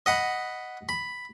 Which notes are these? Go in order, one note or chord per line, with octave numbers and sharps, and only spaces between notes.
D#5 F#5 B5
B5